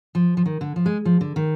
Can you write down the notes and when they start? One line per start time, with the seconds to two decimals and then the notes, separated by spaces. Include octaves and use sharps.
0.15 F3
0.37 F3
0.46 D#3
0.61 D3
0.76 F3
0.86 G#3
1.05 F3
1.21 D3
1.36 D#3